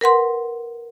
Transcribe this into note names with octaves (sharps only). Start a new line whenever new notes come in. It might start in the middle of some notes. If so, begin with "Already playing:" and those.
A#4 B4 F#5 C6